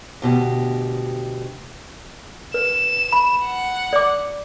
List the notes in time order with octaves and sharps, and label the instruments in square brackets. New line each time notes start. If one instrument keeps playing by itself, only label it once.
[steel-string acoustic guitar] D2 B2 G4
[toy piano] B4 [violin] E7
[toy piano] B5
[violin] F#5
[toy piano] D5 D6